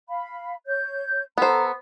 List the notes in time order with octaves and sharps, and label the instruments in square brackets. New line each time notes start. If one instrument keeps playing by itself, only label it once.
[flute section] F5 B5
C#5 G6
[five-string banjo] B3 C5 [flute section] A4 A#5